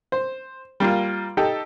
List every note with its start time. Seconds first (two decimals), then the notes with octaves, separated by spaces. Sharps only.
0.12 C5
0.80 G3 A#3 F4
1.37 D#4 G4 A4 G5